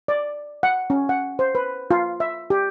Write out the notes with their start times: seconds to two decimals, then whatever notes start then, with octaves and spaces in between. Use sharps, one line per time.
0.08 D5
0.63 F#5
0.90 C#4
1.09 F#5
1.39 C5
1.55 B4
1.91 F4
2.20 E5
2.50 G4